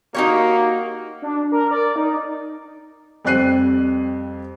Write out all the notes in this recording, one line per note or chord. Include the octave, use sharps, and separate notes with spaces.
A#3 D#4 F#4 G4 C#5
D4
A#4
D5
D#4
F2 G3 C4 F#6 C7 D#7